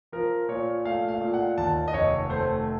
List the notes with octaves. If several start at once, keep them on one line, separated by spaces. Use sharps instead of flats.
F3 A#4
A#2 C#5
A3 F5
F5
A#2
F#5
D#2 A5
D#5
F1 C#5
A3 C5